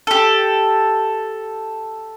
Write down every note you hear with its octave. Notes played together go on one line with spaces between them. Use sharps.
G4 A4